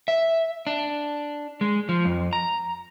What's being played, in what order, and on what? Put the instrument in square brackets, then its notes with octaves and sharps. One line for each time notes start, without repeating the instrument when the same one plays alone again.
[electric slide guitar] E5
D4
G#3
F3
F2
A#5